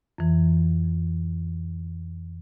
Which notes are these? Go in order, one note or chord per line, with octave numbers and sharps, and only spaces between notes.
F2 E3